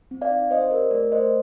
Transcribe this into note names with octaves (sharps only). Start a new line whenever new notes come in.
C4
D5 F5
D#4
C4 C5 D#5
G4 A#4 D5
A3 A#4 D5
A3 C5 D#5